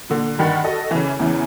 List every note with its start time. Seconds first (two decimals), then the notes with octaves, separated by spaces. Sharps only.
0.10 A#2 D3
0.39 G2 D#3 F#5 B5 A6
0.64 F#4 A4 D#5
0.91 C#3 E3
1.19 E2 C#3 E3